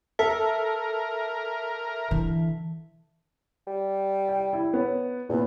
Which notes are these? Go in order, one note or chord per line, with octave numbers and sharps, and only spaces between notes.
A4 A#4 E5
D3 E3
G3
G5
E4
B3 C#5
E2 A#2 B3